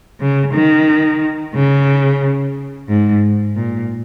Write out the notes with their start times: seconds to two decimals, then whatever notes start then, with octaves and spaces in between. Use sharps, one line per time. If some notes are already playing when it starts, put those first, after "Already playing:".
0.20 C#3
0.54 D#3
1.54 C#3
2.88 G#2
3.56 A#2